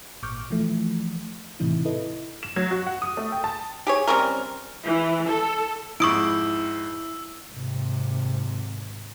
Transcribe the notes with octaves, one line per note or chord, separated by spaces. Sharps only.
G#1 A#2 C#6 D6 F6 G6
E3 F3 A3
A2 C3 E3 D#4 E4
E4 A4 B4 D#5
E7
F#3
F#4
F#5
D#6
A3
G5
A5
G4 G#4 C#5
G3 C4 C#4 A#4
E3
A4
F2 G#2 E4 C#6 D#6 E6 D7
G#1 C3